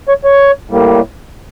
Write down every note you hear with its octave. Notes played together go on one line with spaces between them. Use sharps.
C#5
C#5
A2 G3 A#3